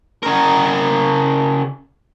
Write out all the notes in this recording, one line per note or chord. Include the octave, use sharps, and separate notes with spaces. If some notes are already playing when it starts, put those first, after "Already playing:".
C#3 A#4